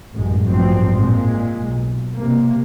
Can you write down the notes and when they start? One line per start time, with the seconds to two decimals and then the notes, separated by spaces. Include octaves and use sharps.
0.14 A1 F#2 G#3
0.47 A1 G2 A#2 F3 F#3 C4
0.95 A#2 G#3
1.61 B1
2.17 C3 A#3